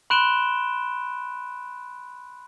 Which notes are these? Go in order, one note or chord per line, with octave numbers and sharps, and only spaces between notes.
B5 C6 F#6 D7 E7 G7